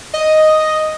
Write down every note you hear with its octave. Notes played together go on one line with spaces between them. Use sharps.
D#5